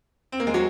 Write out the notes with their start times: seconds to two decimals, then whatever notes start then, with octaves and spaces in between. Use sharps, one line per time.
0.32 C4
0.40 A#3
0.47 G#3
0.54 F#3